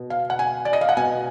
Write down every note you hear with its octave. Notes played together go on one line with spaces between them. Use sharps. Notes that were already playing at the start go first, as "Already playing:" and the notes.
Already playing: B2
F5
F#5
G#5
D5
D#5
F5
F#5
B2 G#5